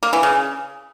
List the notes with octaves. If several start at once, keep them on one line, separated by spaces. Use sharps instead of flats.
A#3
E3
C#3